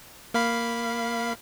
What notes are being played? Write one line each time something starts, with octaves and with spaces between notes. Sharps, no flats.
A#3 F5 B5